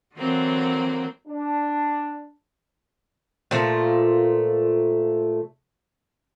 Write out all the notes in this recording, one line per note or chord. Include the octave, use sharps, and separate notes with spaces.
D3 E3 F#3 A#3 C4
D4
A#2 F3 A3